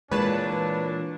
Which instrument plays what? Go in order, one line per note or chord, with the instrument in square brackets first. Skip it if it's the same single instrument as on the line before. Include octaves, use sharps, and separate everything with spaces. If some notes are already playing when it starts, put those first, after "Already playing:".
[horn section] A#2 D4 [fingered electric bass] E3 [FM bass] G#3 [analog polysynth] B4 C#5 A5